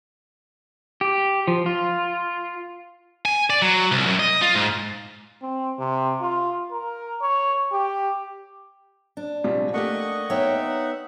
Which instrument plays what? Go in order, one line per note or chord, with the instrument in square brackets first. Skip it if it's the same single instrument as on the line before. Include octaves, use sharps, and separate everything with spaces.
[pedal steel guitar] G4
F3
F4
[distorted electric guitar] G#5
D5
F#3
C2
F#2
D#5
F4
G#2
[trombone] C4
C3
F4
A#4
C#5
G4
[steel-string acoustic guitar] D4
[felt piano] A#1 C3 G3
[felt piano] A3 A#3 G4 [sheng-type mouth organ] D#5 F#5 C#6
[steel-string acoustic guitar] B3 C#5 G5 [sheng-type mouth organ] D#4 E5 F#5